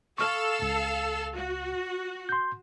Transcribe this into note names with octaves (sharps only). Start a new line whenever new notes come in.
A4 F5 C#6 E6 F6
C#2
F#4
C6 G6